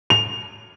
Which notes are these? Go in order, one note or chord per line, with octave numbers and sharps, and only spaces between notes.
F7